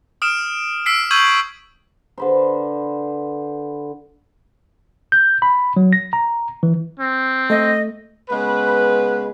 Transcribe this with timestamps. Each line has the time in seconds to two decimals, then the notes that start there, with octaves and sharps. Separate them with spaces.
0.22 D#6 F6 D7 E7
0.86 E6 B6 C7 D7
1.11 C#6 E6 G6 G#6 D#7 F#7
2.18 D3 B4 C5
5.12 G6
5.42 B5
5.77 F#3
5.93 A#6
6.13 A#5
6.63 E3
6.99 C4
7.50 A3 D#5
8.30 C#3 G#3 B3 B4